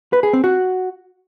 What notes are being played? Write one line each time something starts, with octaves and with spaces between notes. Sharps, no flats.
B4
G#4
C4
F#4